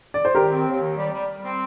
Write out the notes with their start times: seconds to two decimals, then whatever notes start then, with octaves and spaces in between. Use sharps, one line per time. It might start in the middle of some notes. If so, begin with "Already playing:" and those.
0.14 D5
0.25 C5
0.34 D#3 G4 A#4
0.49 C4
0.66 D#2
0.81 D#3
0.96 G3
1.12 G3
1.28 G3
1.43 C4